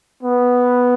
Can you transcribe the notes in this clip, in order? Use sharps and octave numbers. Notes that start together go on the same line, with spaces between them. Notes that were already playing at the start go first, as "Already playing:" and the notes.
B3